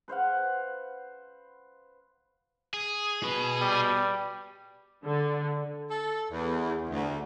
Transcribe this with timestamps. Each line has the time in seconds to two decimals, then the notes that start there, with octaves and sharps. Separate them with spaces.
0.08 B4 C5 F5 F#5
2.74 G#4
3.23 F#4 B4
3.61 G3
5.05 D3
5.91 A4
6.31 E2
6.90 D2